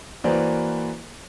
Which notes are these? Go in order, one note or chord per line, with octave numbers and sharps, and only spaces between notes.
E3 A#3 F#4 B4 C5 D5